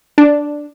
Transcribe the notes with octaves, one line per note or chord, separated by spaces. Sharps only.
D4